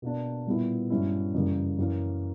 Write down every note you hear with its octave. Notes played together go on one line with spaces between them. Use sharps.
B2 A#3 D4
A#2 G3 B3 E4
G2 F#3 C#4 E4
F#2 C#3 E3 G3 A#3
F#2 E3 A#3 C#4